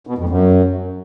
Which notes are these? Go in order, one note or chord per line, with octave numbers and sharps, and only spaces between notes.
B2
F2
F#2